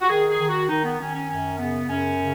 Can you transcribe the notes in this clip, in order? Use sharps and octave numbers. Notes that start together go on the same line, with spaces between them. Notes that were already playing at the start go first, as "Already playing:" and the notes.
F#4
D#3 G#4
G#4
D#3
F#4
D#3 D#4
B3
D#3 C#4
C#4
F#2 C#4
C#3 B3
F#2 C#4
C#3